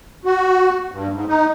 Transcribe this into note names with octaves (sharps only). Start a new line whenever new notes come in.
F#4
G2
G#2
D#4